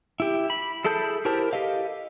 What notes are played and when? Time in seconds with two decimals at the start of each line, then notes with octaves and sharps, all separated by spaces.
0.20 E4 G4
0.50 B5
0.85 E4 G#4 A4 A5 G6
1.25 E4 G4 A#4 C5 A5
1.53 G4 A4 D#5 F5